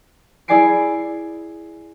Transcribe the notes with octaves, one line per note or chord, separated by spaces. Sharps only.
E4 G#4 D5 G#5 C7 D7